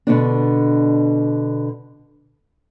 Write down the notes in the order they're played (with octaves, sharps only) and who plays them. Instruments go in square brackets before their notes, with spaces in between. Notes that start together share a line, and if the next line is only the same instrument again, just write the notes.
[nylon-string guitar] B2 D3 D4